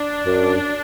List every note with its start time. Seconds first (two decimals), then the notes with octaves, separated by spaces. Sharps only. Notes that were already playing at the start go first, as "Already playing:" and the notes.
Already playing: D4
0.26 F#2